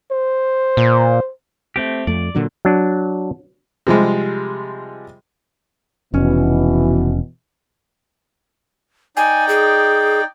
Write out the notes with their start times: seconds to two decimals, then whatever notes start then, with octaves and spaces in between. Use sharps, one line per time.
0.11 C5
0.77 A#2
1.76 A3 C4 G4
2.07 F2 A3 D5
2.35 A#2 D3 F#3
2.65 F#3 D4
3.87 C3 F3 G3 G#3
6.14 F1 B2 E3 C#4
9.17 D#4 D5 G5 G#5
9.49 G#4